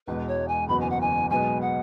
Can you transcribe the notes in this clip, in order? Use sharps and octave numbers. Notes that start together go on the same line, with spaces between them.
E1 E2 B2 G#3 B4
C#5
G#5
F#1 E2 B2 B3 F#4 B5
G#5
F#5
G#5
B1 B2 G#3 B3 G#5
F#5